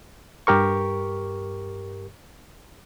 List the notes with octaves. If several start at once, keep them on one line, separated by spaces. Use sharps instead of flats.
G2 G4 A#4 C#6